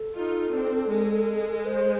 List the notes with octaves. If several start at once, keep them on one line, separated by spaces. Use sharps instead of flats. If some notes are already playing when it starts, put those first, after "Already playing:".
Already playing: A4
D#4 F4
C4 D4
G#3
C5